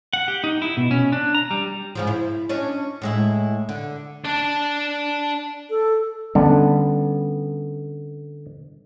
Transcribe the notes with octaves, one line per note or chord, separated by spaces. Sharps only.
F#5
G4
D#4
E4
B2
C#4
D4
A#5
G3
G#2 C#3 F3
E4
C#4 D4 D#5
A2 G#3 E4
D3
D4 D5
A4
D3 G3 B3 C#4